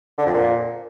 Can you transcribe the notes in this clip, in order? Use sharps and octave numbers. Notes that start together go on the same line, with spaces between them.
D3
F2
A#2